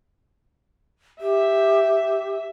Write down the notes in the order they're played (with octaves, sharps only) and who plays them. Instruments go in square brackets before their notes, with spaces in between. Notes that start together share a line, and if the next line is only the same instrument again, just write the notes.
[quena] G4 [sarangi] E5